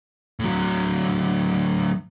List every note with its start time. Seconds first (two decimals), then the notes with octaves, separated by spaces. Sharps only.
0.39 A2 F#3